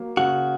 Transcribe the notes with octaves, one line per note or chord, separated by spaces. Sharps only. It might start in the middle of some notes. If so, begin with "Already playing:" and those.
Already playing: F#3 A#3
C#3 F#4